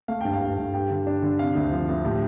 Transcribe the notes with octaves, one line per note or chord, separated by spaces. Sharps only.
A3 F5
G2 G5
F5
G2
G2
G3 G5
D3
D4
D3
C3 F5
D2
F3
D2
A2 G4